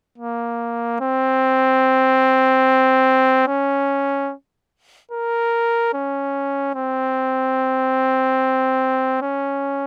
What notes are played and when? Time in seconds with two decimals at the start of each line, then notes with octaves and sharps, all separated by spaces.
0.18 A#3
1.01 C4
3.47 C#4
5.12 A#4
5.94 C#4
6.75 C4
9.22 C#4